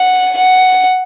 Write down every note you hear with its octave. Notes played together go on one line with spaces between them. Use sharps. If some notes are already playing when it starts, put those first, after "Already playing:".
Already playing: F#5
F#5